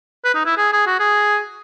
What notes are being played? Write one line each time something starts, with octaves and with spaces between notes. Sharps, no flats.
B4
D#4
E4
G#4
G#4
F#4
G#4